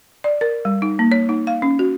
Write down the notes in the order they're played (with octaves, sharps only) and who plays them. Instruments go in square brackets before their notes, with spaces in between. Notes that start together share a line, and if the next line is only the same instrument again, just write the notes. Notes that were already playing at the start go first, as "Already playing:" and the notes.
[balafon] D5
A#4
G3
D#4
A#3
C#5
D#4
F5
C#4
F#4